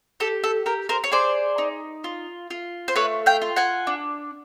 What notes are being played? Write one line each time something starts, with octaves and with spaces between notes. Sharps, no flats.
G4 A4
A4
G4 A#4
A#4 C5
C#5
G#4 C5 D5
D#4
F4
F4
C5
A3 B4 C#5
F5 G5
F4
F#5 G#5
D4